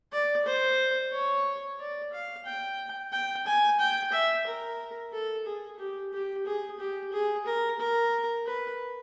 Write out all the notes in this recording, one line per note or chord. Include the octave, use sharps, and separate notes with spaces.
D5
C5
C#5
D5
F5
G5
G5
G#5
G5
E5
A#4
A4
G#4
G4
G4
G#4
G4
G#4
A#4
A#4
B4